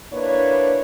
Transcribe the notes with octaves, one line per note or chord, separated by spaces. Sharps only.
A#3 D4 E4 B4 C#5